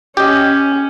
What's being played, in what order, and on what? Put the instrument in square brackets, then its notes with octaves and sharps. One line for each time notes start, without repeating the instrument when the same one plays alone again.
[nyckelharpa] C#4 [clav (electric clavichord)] G4 D#5